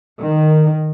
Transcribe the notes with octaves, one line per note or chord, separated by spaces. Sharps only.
D#3